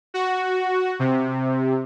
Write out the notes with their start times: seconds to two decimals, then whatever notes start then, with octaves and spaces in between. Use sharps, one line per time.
0.14 F#4
0.99 C3